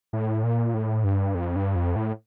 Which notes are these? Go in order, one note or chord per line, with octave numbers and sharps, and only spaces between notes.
A2
A#2
A2
G2
F2
G2
F2
A2